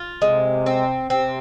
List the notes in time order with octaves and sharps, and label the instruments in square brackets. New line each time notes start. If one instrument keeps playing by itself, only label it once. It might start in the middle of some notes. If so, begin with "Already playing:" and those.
Already playing: [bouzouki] F4
[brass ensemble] C3 [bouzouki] G#3
[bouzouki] C4
[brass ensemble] C3 [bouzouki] C4